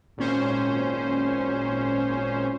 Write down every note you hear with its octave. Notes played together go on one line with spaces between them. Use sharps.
G#1 A#2 C#4 C5